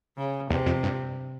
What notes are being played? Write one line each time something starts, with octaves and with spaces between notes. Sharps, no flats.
C#3
E2 C3
F2
G2